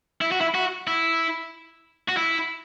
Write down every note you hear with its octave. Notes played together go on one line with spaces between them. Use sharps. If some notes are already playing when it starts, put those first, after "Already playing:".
E4
F#4
E4
F#4
E4
F#4
E4